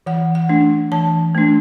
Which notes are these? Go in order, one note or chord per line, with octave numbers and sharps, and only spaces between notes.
E3 F#5
F#5
A3 D4
E3 A5
A3 D4